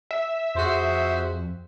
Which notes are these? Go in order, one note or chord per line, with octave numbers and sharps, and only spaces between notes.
E5
F2 F#4 G#4 C5